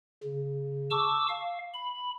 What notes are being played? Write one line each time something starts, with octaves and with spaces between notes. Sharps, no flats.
C#3
A5 C#6 D6 E6
F5
B5